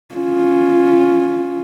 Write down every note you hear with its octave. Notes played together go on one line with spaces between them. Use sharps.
C#4 F4